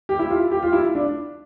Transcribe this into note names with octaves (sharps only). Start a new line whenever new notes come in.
G4
E4
F4
G4
F4
E4
D4